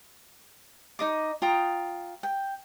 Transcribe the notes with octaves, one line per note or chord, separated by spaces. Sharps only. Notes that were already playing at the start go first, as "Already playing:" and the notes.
D#4 D#5 D6
F4 G5 A#5 D#6
G5